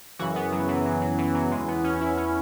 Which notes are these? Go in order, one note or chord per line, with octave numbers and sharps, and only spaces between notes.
F#2 C#3 E3 F#4
B3
F#3
E3
F#3
F#3
E3
F#3
E2 E3 G#3
B3
C#4
E4
C#4